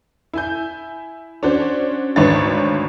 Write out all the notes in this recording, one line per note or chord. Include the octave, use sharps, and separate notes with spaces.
E4 G#5 G6
C#4 D4 F#4 C5
G#1 D2 D4 B4 C#5 A6